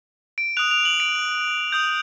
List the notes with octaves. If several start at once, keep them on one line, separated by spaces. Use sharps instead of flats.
D7
D#6 F#6 F7
F7
F#7
D7
D#6 G6